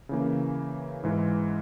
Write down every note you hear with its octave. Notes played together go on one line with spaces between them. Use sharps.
C#3 E3 A#3
G#2 E3 G#3